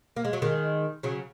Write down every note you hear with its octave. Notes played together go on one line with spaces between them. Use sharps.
A#3
G#3
F#3
D#3 G#3
C#3 F#3